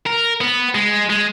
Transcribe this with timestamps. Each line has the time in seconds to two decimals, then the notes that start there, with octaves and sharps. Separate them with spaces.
0.06 A#4
0.41 B3
0.75 G#3
1.10 G#3